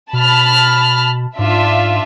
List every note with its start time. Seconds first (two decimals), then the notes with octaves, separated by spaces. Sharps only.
0.13 B2 A5 B5 F6
1.39 G#2 D4 F4 E5